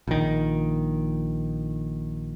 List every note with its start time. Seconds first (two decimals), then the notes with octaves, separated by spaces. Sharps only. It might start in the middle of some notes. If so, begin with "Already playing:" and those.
0.08 A#1 D#3